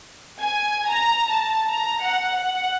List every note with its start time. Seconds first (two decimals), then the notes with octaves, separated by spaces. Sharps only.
0.40 G#5
0.88 A#5
1.30 A5
1.68 A#5
2.02 F#5
2.34 F#5